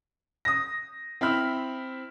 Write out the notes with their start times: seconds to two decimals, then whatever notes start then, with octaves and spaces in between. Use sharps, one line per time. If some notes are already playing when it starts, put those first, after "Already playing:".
0.45 D#6 A#6
1.21 C4 E4 B5 F6